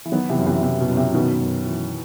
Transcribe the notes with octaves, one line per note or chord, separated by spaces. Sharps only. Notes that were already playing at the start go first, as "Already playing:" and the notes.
E3
D#3 F#3 B3
C3 E3
F#2
C3 E3
C3 E3
B2
F#2
C3
B2 D#3 B3
F#2
E3